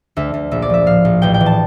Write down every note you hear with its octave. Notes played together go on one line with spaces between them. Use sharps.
D2 E5
D2
A#1 E5
D5
F3 E5
A2 F5
A#1
A1 G5
G5
E3
A5